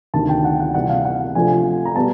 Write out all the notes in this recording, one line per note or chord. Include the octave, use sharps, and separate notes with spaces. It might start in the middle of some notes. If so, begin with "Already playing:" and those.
D2 C3 D#3 A5
G5
F#5
F#5
C3 E3 G3 F#5
F5
F#5
C3 F3 A3 D4 G#5
A#5
B2 G3 B3 A5